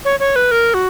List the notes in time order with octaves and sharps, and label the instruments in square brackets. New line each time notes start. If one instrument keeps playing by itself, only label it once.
[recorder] C#5
C#5
B4
A#4
F#4